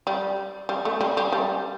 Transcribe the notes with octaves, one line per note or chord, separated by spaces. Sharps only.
G3
G3
A3
G3
G3
G3